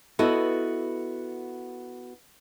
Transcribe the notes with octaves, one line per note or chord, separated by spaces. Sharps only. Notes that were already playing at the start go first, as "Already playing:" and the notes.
B3 E4 F#4 A4 D#5